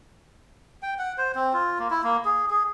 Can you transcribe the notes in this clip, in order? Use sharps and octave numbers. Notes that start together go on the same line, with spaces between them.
G5
F#5
C5
C4
F4
A#3
E4
A#3
G#4
G#4